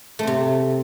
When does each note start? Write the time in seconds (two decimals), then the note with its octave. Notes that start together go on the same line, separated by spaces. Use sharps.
0.19 A3
0.23 C4
0.27 C3